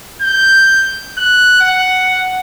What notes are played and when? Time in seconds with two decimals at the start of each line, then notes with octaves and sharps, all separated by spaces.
0.22 G6
1.18 F#6
1.60 F#5